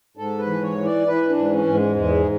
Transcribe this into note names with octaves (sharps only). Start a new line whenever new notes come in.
G#2 A4
B4
E3
C#5
E3
D5
E3 B4
D4
G#2
C#4
G#2
G#3
E2 G#3